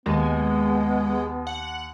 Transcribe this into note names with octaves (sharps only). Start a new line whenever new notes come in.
D#2 G#3 B3
F#5